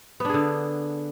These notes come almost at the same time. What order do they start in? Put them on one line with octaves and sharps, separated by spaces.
B3 D4 G#4 D3